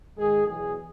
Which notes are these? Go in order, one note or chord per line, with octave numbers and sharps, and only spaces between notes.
G#2 D#3 G#3 G#4
E2 B2 F#3 G#4